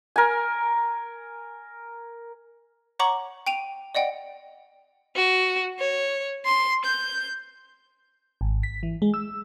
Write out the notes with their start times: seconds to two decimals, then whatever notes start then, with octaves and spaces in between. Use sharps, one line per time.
0.16 A#4 G#5
2.99 C#5 F#5 A#5 C#6 D6 F#7
3.47 G5 D7 D#7 F7
3.95 D5 D#5 F#5 G5
5.16 F#4
5.79 C#5
6.45 C6
6.85 G6
8.41 G#1
8.63 B6
8.83 E3
9.02 G#3
9.14 E6